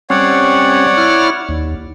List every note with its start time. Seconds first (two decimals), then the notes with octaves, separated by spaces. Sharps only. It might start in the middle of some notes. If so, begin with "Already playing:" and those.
0.10 G3 C4 C#4 C#5 D5 F#5
0.97 E4 F6
1.49 D#2